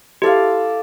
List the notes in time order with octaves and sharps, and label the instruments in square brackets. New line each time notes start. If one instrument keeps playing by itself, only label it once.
[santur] E4 A4 D5 F5 [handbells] G4